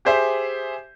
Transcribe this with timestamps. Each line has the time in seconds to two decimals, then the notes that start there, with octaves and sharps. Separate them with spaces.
0.05 G4 G#4 C5 E5